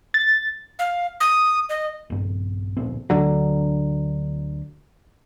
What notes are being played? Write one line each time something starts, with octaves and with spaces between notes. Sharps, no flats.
A6
F5
D#6
D#5
A#1 G2
D1 A#1 C4
D2 D3 F#3